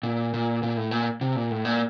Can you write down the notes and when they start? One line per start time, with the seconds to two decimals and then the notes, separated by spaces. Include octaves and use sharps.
0.03 A#2
0.34 A#2
0.63 A#2
0.77 A2
0.91 A#2
1.21 C3
1.36 A#2
1.51 A2
1.65 A#2